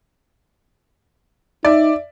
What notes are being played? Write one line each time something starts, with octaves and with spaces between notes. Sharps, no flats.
D#4 D5 E5